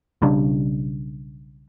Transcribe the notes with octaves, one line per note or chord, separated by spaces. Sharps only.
B1 C#3 G3 D4